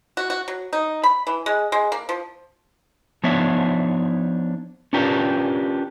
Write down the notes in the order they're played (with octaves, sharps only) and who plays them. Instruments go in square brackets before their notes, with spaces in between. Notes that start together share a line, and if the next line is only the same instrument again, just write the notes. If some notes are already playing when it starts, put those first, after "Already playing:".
[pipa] F#4
F#4
F#3
D#4
B5
E3
G#3
G#3
A#3
F3
[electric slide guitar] F3 B3 D4 D#4 C#5 E5
C#4 D4 F4 G4 A#4 B4